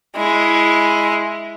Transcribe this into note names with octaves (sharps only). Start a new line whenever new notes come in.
G#3 E4